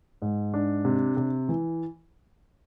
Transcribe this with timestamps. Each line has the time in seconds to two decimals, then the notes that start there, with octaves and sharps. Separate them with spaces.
0.22 G#2
0.54 D4
0.85 C3
1.17 C3
1.49 E3